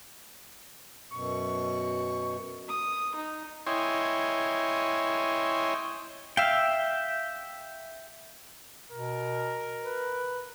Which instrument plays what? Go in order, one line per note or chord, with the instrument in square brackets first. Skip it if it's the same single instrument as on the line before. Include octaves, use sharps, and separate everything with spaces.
[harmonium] F#2 B2 [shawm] C#6
[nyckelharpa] D#6
D#4
[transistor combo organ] E4 C#5 D#5 G5 G#5 C6
[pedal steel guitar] E5 G5 [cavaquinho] F5
[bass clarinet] B2 [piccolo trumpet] A#4
[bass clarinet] B4